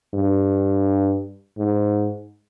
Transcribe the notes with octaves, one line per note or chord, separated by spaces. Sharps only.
G2
G#2